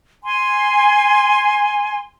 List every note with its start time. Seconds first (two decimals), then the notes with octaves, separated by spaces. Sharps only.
0.23 G#5 C6